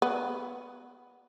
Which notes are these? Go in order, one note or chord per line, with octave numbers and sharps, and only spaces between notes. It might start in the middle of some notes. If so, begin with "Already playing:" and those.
B3